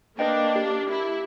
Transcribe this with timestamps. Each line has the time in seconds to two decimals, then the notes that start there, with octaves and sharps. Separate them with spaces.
0.19 A#3 D4 B4 D#5 G5
0.56 G4
0.91 E4